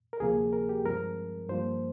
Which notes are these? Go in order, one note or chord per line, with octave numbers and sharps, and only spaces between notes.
A#4
D2 C3 F3 A#3 G#4
A#4
G4
G2 F3 G#3 C4 A#4
G2 F3 A#3 C5